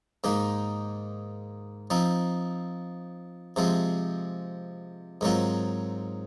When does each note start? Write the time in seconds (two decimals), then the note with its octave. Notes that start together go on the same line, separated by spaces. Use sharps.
0.24 G#2 D#3 A#3 D#4
1.90 F3 C4 D#4
3.56 C3 F3 G#3 C4
5.21 G#2 D#3 F#3 C4 F4